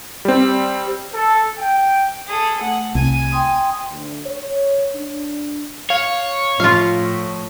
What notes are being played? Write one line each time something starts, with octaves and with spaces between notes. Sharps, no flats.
G3 C4
A4
G5
G#4 A4
A3 F#5
C2 G#5
G5 C6 D#6
D2
C#5
D4
C#5 F5
A2 F3 F4 F5